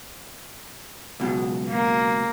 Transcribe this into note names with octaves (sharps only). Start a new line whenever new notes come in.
C#2 B2 F#3
A#3